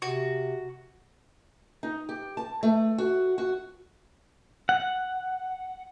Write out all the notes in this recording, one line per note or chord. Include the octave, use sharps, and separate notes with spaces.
C3 F#4
D#4
G4
A5
A3
F#4
F#4
F#5